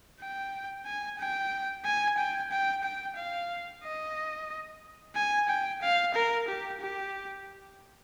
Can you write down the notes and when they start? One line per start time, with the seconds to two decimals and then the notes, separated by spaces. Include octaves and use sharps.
0.20 G5
0.86 G#5
1.19 G5
1.85 G#5
2.17 G5
2.51 G5
2.83 G5
3.17 F5
3.84 D#5
5.16 G#5
5.48 G5
5.82 F5
6.14 A#4
6.48 G4
6.81 G4